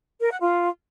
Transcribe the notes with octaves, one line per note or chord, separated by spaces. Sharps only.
A#4
F#5
F4